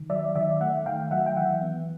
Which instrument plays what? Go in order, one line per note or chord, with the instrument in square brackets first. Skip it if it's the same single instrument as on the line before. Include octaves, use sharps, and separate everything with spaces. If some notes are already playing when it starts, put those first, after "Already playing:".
Already playing: [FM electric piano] D#3
F#3 D5 E5
D#3 D5 E5
A3 E5 F#5
D#3 F5 G5
F#3 E5 F#5
G5
E3 E5 F#5
B3